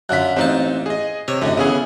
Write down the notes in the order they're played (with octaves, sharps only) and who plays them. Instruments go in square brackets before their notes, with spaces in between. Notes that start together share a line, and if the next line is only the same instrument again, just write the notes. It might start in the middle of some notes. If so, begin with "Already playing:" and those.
[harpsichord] F#2 D3 F4 [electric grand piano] F#6 B6
[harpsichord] A1 A#3 A5 [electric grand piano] C4 D#4
[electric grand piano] G#4 D#5
[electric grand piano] C3 [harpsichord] C#5
[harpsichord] F#2 A2 [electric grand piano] D3 D#5
[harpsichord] C#3 E3 [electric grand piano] B3 C#4 G#4